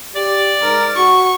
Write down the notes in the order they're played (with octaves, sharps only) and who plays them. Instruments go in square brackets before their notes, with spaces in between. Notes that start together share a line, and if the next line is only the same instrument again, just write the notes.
[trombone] G4 [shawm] D5
[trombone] G#2 [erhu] A#4
[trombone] F#4 [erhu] C#6